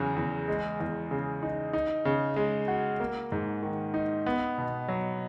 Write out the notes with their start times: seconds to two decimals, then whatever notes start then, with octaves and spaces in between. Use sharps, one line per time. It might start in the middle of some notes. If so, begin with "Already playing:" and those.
Already playing: E2 C#3 F#3
0.16 E2
0.48 G#3
0.80 E2
1.11 C#3
1.43 D#4
1.73 D#4
2.05 C#3
2.36 G#3
2.68 F#4
3.00 A#3
3.32 G#2
3.63 D#3
3.94 D#4
4.26 B3
4.58 B2
4.88 F#3